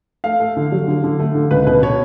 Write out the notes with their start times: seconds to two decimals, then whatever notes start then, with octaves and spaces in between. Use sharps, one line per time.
0.24 A3 F5
0.40 A3
0.57 D3
0.72 F#3
0.88 D3
1.04 D3
1.20 A3
1.35 D3
1.51 C#2 B4
1.66 B2 B4
1.82 B2 C#5